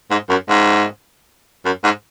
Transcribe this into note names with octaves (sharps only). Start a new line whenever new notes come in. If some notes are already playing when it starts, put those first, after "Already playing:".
G#2
F#2
G#2
F#2
G#2